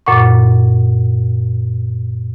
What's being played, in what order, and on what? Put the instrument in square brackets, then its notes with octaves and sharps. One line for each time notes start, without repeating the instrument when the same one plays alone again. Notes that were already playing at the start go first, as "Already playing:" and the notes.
[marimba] F#2 A#2 F#5 C#6